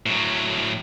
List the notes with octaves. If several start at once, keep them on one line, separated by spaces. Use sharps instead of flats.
A2 F#3